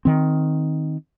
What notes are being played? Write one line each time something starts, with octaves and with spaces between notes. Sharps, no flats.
D#3 C4